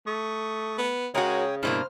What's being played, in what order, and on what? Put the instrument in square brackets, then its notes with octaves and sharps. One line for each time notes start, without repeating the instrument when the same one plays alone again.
[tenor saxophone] A3 [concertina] C#6 D#6
[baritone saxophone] B3
[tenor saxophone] C#3 [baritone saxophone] G#3 [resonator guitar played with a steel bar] F#4 A#4 [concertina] C#5 G5 D#6
[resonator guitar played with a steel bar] G2 B2 A#3 [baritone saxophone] E4 [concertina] C5 F6